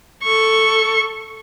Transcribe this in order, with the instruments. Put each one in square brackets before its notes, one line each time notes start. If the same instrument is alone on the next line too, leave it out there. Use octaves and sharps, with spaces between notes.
[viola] A4 C#6